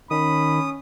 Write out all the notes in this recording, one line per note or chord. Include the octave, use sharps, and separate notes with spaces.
D#3 C#4 B5 D#6